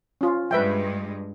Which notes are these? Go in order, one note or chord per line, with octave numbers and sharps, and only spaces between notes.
C#4 F4
G2 G#3 B4 E5 G5